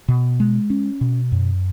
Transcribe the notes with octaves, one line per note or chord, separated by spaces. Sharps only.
B2
G#3
C#4
B2
F#2